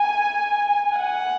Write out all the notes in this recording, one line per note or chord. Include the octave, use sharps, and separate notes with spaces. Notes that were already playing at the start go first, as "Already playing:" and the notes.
Already playing: G#5
F#5